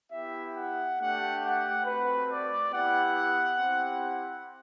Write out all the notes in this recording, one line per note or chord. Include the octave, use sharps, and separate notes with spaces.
B3 E4 G4 E5
F#5
A3 D4 G4 F#5
F#5
A3 C4 F#4 B4
D5
B3 E4 G4 F#5
C4 E4 G4